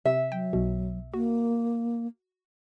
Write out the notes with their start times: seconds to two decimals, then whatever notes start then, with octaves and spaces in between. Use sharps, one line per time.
0.05 C3 E5
0.32 F#3 G5
0.53 B1 B2
1.14 A#3 F#4